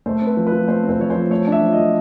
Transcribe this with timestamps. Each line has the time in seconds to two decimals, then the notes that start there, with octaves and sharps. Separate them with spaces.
0.06 A3 C5
0.22 C4 B4
0.37 F3
0.47 B4
0.52 F3
0.68 A3 C5
0.83 C4
0.89 C5
1.00 F3 C#5
1.10 C5
1.15 F3
1.30 A3 C#5
1.47 D4
1.52 E5
1.62 F3
1.73 F3 D#5